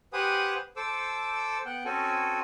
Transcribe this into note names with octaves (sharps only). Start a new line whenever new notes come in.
G4 B4 C5 F#5 G#5 D#6
A4 C5 D6 E6
B3 F#5 G5
C4 C#4 F#4 A4 G#5